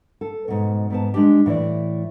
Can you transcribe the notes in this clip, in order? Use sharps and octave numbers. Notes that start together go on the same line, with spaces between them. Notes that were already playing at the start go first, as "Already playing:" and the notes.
A4
G#2 B2
G#2 B3 A5
G#3 D4 G4
A2 E3 E4 D5